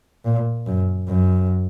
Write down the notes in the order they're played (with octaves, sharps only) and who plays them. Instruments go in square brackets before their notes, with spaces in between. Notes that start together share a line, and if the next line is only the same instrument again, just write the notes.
[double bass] A#2
F#2
F#2